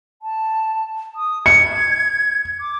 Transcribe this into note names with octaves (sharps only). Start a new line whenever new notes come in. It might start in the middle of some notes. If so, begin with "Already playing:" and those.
A5
D#6
G#6 C#7
D6